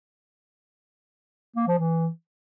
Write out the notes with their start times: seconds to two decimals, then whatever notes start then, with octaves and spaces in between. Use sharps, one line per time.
1.56 A#3
1.67 F3
1.79 E3